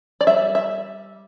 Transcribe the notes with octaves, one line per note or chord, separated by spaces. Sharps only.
D5
G3 E5
E5